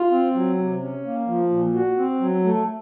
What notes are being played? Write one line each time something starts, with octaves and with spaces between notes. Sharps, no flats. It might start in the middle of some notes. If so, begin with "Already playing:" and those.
Already playing: F4
C4
F#3
C3
C#4
A#3
F3
A#2
F#4
C4
F#3
A3